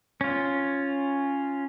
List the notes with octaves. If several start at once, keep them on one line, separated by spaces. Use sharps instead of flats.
C#4 F4